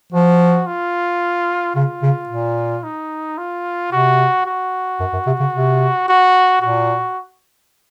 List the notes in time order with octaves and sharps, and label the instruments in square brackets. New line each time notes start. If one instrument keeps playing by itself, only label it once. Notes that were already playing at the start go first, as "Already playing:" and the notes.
[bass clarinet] F3 [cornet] F#4
[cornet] F4
[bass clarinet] C#3 [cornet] F4
[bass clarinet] C#3
A#2
[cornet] D#4
F4
[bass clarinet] C3 [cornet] F#4
[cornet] F#4
[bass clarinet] F#2
F#2
C3
C#3
C3
[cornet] F#4
[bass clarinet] A#2 [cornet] F#4